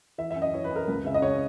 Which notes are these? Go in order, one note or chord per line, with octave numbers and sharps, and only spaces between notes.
E3 E5
F#2 E5
D#5
E3 C#5
B4
F#2 A#4
C#2 B4
C#3 E5
D#5
C#3 C#5